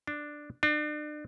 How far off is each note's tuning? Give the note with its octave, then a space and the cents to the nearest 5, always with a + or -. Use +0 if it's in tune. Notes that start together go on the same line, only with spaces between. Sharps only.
D4 +5
D4 +35